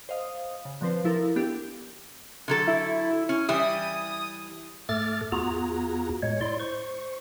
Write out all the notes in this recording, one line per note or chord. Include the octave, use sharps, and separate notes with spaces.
C5 D#5 F5 D#6
C#3
D3 F3 C4 B4 C5
F3 E4 A4 A#4
B3 D4 G4
D3 F#3 A4
E4
C#4
E3 G3 E4 D#6
G#2 A3 A4 D6 F6 A6
E2 B3 F4 F#4 G#4 A#5
A2 G#3 C#5
E4 D5 C6
C5 C#6